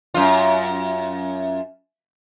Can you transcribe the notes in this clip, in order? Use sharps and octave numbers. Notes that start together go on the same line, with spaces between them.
F#2 F4